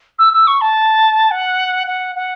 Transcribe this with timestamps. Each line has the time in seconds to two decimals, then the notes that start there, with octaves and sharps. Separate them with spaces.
0.18 E6
0.33 E6
0.47 C#6
0.61 A5
1.31 F#5
1.87 F#5
2.15 F#5